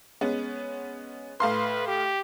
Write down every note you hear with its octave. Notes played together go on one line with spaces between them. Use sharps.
G#3 B3 C#4
A2 B4 F5 C6
G4